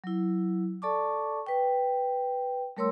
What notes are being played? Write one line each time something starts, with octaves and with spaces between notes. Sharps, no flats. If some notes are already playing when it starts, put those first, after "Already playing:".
F#3 E4
A4 D5 A5 C#6 D6
B4 G5
G3 A3 A#4 C#5 C6 E6